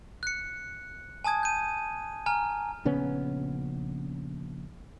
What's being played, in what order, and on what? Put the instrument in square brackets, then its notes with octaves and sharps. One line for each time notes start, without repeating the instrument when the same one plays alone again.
[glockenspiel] F#6 C#7
G#5 A5 D#6 G#6
G6 D#7
G#5 A#5 F6
[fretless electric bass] A#1 C#3 B3 C#4